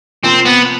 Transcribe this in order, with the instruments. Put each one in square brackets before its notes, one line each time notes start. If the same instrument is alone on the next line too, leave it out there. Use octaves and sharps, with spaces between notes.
[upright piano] C3 F3 A#3 [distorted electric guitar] C4
[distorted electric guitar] B3